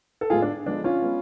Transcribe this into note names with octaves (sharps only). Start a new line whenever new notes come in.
A4
A2 G#3 B3 F4 G#4
D4
F3 G#3 B3 D4
C#4 F4
G#3 B3